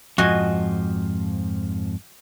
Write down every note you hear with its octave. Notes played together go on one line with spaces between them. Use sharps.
F2 G#2 F3 F#4 D#5 G#5